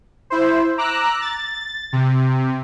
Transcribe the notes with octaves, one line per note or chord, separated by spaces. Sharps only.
E4 C5
A#5 D6 E6 F#6
A6
C3